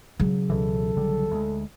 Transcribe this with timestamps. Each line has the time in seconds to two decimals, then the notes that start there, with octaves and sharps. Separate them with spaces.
0.20 C#3 F#3
0.50 C#2 B2 E3 A4
0.96 B1 D3 G3
1.31 D2 G3 G#3